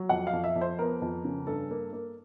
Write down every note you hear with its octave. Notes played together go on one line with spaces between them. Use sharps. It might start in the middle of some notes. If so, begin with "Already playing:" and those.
Already playing: F#3
F2 F#5
F5
F2
E5
F2
C5
B3 A#4
F2
C#3
G2 A4
A#3
A#3